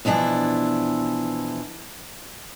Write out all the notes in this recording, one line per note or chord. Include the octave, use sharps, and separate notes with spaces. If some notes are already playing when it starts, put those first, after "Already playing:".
B2 E3 F3 D4 E4